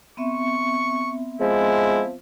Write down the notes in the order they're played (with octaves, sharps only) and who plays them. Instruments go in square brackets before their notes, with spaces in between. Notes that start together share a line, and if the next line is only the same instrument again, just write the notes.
[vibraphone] B3 C4 E5 [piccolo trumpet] C#6
[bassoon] F3 [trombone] G#3 [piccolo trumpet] E4